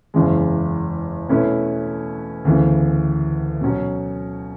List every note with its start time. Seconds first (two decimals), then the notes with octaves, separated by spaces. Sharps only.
0.14 F#1 E2 C#3 E3 G#3
1.29 B2 A3 C#4 E4 B4
2.45 D2 C#3 E3 B3
3.61 B2 F#3 C#4